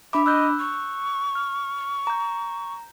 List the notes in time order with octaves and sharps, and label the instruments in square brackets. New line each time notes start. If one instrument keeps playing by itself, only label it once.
[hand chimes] D4 B5 D6 [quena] E5
[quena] D#5 [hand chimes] E6 F#6 G6
[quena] C#6
[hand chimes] F6
A#5 G6